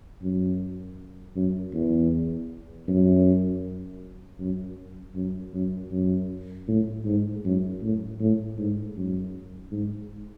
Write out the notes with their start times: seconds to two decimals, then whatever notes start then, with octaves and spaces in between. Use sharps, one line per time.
0.22 F#2
1.35 F#2
1.73 E2
2.88 F#2
4.39 F#2
5.15 F#2
5.53 F#2
5.91 F#2
6.68 A2
7.05 G#2
7.44 F#2
7.81 A2
8.20 A2
8.58 G#2
8.96 F#2
9.71 G#2